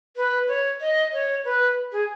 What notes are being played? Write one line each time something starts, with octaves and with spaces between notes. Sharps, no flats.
B4
C#5
D#5
C#5
B4
G#4